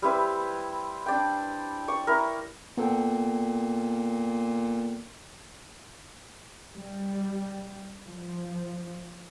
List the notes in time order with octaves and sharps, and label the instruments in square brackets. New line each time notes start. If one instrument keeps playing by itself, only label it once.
[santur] G3 C4 E4 B4
D4 D5 G5
D5 C#6
E4 A#4
[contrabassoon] A#2 [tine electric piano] B3 A4 G5
[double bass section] G3
F3